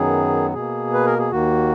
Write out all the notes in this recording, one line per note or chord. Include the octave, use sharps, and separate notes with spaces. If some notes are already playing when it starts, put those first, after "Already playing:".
Already playing: F#2 D#3 F#3 B3 G#4
B2 A#3 G#4
B4
A#4
G#4
D#2 D#3 A#3 F#4